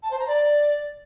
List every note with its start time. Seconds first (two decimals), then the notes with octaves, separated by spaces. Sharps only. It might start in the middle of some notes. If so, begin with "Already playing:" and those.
0.03 A5
0.11 C5
0.19 A#5
0.28 D5